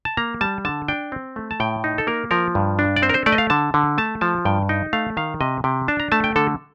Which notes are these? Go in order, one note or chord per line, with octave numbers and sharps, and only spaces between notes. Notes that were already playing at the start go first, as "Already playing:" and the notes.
A5
A#3 A#5
G3 A5
D3 A5
D4 G5
C4
A3
A5
A2 G5
D#4
A4
A#3 A#4
F3 A#4
G2
D4
D5
C4 C5
A#4
C5
A3 D5
D#5
F5
D3 A5
D3
A3 A5
F3 A5
G2 G5
D#4 G5
A3 F5
D#3 F5
C3 D#5
C3 G5
D4 A5
A#5
A3 A5
G5
D3 A4